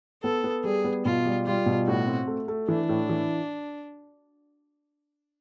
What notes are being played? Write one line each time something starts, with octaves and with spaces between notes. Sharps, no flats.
B3 A4
B3
G3 G#4
B3
B2 F4
G3
G3 F4
B2
A2 F#4
C4
A3
A3
E3 D4
A2
E3